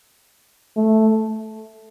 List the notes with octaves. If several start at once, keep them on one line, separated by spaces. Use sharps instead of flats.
A3